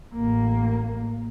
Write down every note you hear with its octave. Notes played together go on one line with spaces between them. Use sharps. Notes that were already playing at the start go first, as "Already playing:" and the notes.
A1 A#3